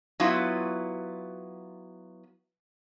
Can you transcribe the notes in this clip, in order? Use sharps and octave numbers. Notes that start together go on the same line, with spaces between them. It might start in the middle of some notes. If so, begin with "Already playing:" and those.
F#3 B3 E4 F4